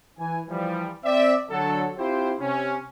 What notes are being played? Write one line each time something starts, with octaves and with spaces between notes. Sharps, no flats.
E3 G#5
E3 F3 G3
C4 D5 E5
D3 F#3 A4
C4 E4 F4 G4 C5
C3 C#4